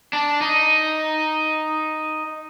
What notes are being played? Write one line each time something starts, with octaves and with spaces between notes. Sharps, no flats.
D4
D#4